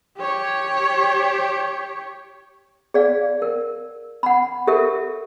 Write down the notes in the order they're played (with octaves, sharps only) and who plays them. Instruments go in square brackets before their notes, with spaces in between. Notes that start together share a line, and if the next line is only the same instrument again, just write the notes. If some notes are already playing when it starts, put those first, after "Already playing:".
[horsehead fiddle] G4 C#5
[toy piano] G#4 D5 F5
A#4
F#5 B5
G4 A4 A#4 E5